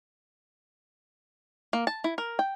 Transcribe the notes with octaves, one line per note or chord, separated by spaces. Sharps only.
A#3
A5
E4
A#4
G5